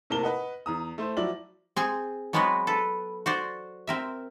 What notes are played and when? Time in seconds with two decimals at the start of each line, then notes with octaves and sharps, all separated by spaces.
0.10 A2 C3 A#3 A#4 A5 G7
0.23 B4 D#5 F#5
0.66 E2 A#5 D#6
0.98 A3 E4 C5
1.17 F3 F#3 E4 D5 F#7
1.76 C4 G#4 G#5
2.33 F#3 G#3 B3 C4 F#4 B4
2.67 A4 B4
3.26 F#4 C5 D5
3.87 C4 A#4 E5